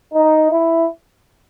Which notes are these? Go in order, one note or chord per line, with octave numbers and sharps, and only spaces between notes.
D#4
E4